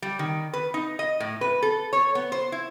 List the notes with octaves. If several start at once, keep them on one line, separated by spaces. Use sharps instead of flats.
G3
D#3
B4
D#4
D#5
A2
B4
A4
C#5
B3
C5
E4